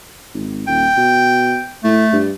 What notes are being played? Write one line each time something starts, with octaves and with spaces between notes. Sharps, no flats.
G#1
D#1 G5
B2
A2 A3
G2